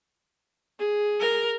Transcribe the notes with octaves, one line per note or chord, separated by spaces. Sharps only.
G#4
A#4